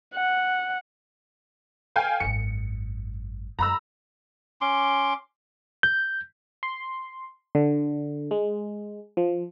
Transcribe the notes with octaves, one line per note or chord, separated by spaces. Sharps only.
F#5
F5 G5 G#5
G#1 F#2 C#7
F#2 F4 A#5 B5 E6
C#4 C6 D6
G6
C6
D3
G#3
F3